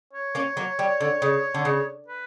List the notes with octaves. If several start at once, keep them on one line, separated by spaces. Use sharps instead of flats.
C#5
A#3 C#4
F#3 A#3
G3
D3
C#3
D3
C#3
B4